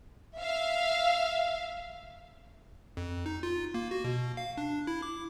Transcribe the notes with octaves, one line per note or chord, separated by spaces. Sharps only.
E5 F5
F2
D#4
F4
A#3
F#4
B2
F5
D4
E4
D6